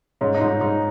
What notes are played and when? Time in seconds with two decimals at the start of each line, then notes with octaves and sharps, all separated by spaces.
0.21 G#2 C#4
0.34 D#4
0.41 G#2
0.48 D#4
0.61 G#2 D#4